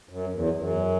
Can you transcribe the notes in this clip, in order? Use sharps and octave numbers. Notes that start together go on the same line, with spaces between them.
F#2
E2
F#2